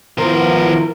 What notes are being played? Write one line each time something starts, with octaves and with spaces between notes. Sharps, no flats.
D#3 F3 B3 E4 A#4 C5